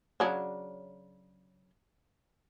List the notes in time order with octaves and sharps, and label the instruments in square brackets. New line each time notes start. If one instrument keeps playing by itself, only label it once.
[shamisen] C#3 F#3 D4